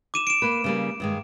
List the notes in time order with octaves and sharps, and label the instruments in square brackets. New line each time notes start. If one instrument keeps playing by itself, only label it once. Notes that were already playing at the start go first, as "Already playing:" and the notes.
[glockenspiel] D6 D#7 E7
D7 E7
[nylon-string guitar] A#3 B4
C#3 G3 A#3
G2 D#3 G#3